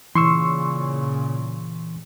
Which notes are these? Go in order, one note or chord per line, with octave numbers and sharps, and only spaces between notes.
A#2 C#3 E3 C6 C#6 E6